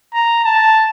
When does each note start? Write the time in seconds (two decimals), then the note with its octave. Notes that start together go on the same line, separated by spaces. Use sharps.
0.14 A#5
0.45 A5